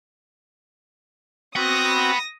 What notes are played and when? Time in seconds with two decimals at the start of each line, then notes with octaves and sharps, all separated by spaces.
1.56 C4 F#4 F#5 B5 D#6 A#6